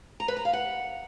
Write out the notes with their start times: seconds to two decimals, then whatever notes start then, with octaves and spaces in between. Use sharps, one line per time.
0.20 A#5
0.28 B4
0.37 A#5
0.45 F5
0.53 F#5